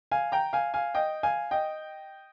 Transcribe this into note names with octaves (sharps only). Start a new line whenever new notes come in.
F5 G#5
G5 A#5
F5 G#5
F5 G#5
D#5 G5
F5 G#5
D#5 G5